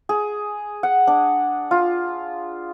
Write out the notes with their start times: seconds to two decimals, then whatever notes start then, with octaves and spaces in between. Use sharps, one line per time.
0.09 G#4
0.83 F#5
1.07 D4
1.71 F4